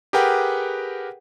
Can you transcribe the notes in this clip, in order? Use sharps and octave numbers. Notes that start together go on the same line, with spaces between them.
G4 G#4 A#4 B4 F#5 G5